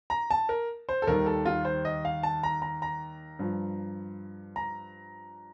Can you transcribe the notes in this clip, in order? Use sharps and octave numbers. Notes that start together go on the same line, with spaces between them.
A#5
A5
A#4
C5
A4
D#2 D#3 G3 A#4
A4
F4
C5
D#5
F5
A5
A#5
A#5
A#5
G2 F3
A#5